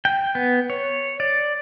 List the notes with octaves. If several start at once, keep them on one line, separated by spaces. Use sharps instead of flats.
G5
B3
C#5
D5